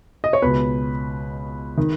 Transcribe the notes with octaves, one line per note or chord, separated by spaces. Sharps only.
D#5
C#5
C#2 B2 B4
D#3